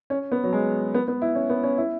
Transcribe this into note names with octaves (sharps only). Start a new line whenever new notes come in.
C#4
B3
F#3
G#3
B3
B3
E4
C#4
B3
C#4
E4